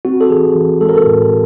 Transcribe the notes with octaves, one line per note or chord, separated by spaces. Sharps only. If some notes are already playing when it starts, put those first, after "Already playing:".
C4 F#4
A4
E3 G#4
E3
G#3 A4
A#4
A4
A2